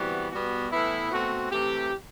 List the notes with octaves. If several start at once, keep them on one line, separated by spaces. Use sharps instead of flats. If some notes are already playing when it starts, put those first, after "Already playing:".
Already playing: C3 E3 G3 B3 F#4
B2 G3 B3 F#4
A2 E3 B3 E4
B2 A3 C4 F#4
C3 E3 A3 G4